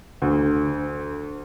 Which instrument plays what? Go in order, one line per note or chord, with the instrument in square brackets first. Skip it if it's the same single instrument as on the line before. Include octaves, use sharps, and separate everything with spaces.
[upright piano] D2